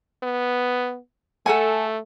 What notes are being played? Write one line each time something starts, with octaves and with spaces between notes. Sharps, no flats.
B3
A3 A4 F#5 G#5